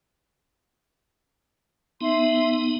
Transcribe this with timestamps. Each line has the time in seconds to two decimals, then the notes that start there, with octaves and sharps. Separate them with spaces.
2.01 B3 D#4 E5 C6